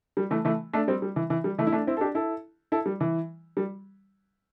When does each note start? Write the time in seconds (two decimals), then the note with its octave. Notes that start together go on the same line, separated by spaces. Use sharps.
0.17 G3
0.31 E3 A3
0.45 E3 A3
0.73 A3 D4
0.88 G3 C4
1.02 G3
1.16 E3
1.30 E3
1.44 G3
1.58 E3 A3
1.67 E4
1.72 A3 D4
1.87 C4 E4
1.97 A4
2.01 D4 G4
2.15 E4 A4
2.72 E4 A4
2.86 G3
3.01 E3
3.57 G3